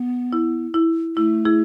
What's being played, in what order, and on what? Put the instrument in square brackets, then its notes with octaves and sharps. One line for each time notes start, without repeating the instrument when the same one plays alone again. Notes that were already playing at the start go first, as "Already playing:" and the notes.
Already playing: [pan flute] B3
[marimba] E4
E4
[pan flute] A3 [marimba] E4
[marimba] E4 G#4